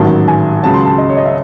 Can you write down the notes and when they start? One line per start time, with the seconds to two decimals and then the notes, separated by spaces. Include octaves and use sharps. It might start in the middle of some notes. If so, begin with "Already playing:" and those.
Already playing: A1 G#2 D#3 F#3 A5
0.28 G#5
0.63 C#2 C#3 F#3 A5
0.74 C6
0.85 A5
0.98 D#5
1.09 C#5
1.17 D#5
1.26 E5